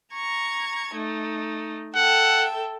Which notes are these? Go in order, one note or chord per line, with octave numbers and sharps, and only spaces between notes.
A#5 C#6 G#6
A3 D#4
A4 E5 F#5 G5